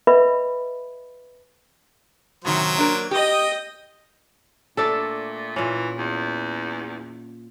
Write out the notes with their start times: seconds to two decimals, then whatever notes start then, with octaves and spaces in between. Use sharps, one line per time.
0.07 B4 D#5 E5 B5
2.45 A2 C3 D#3 F#3 C5
2.76 A#3 D4 A#4
3.11 G4 D#5 G5 D#6
4.77 A#2 A3 D4 A4
5.56 A#2 E3 C#4
5.97 E2